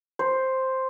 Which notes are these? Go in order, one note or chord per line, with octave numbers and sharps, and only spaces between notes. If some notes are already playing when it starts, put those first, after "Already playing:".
C5